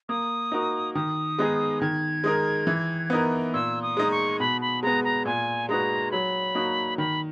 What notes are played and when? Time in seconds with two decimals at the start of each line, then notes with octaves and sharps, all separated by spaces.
0.09 A#3 D#6
0.52 D#4 F#4 A#4
0.95 D#3 D#6
1.38 G#3 B3 D#4 G#4
1.82 D#3 G#6
2.24 G#3 D#4 A#4
2.67 E3
3.10 B3 D#4 A#4
3.54 A#2 E6
3.82 D#6
3.97 G#3 D#4
4.11 C#6
4.40 B2 B5
4.61 B5
4.83 G#3 B3 A#5
5.04 A#5
5.25 A#2 G#5
5.69 G#3 D#4 F#4 B4 A#5
6.11 F#3 B5
6.55 A#3 D#4 F#4
6.98 D#3 B5